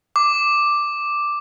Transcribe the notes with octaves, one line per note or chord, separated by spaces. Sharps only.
D6